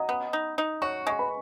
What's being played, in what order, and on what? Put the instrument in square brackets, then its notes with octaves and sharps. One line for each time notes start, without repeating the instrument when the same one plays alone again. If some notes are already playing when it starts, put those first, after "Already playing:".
Already playing: [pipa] F#3 [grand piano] D#5 D#6
[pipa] B3
D#4
D#4
[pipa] F#4 [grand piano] C#5 C#6
[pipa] G#3 [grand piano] C#6
[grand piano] B4 B5